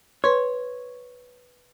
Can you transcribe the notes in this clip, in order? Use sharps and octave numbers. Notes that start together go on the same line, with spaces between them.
B4 C#5 C6